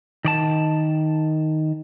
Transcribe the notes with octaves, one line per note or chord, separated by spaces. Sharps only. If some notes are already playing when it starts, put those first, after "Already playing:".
D#3 D5 A5